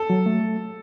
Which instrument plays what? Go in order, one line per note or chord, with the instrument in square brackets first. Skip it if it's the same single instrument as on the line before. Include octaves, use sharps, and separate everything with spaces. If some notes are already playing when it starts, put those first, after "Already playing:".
Already playing: [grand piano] A4
[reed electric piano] F#3
A3